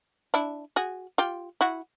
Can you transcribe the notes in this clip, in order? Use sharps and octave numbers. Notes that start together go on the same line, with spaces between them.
D4 E4
F#4 G#4
F4 G4
E4 F#4